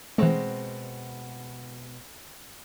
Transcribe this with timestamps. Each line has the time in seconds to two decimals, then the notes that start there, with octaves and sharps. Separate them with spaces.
0.18 B2 E3 G#3 A3 C4